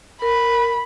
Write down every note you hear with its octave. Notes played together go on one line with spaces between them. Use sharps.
A#4 B5